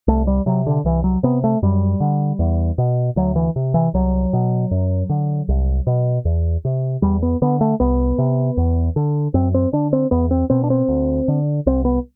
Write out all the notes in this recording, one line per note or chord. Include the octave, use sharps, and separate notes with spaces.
C2 A3
G3
C3 F#3
D3
C2 E3
F#3
C3 B3
A3
F#2 G3
D3
E2
B2
D2 F#3
E3
C3
E3
C2 F#3
B2
F#2
D3
C2
B2
E2
C3
E2 G3
B3
D3 B3
A3
C2 B3
C3
E2
D3
F#2 C4
C4
D3 D4
C4
E2 B3
C4
B2 C4
D4
C4
D2
D3
C2 C4
B3